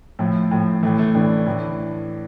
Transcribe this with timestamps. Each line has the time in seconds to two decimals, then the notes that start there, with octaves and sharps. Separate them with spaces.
0.19 A2 F3 A3
0.51 A2 F3
0.83 A2 E3 A3
0.99 A3
1.14 A2 E3 D4
1.47 A2 E3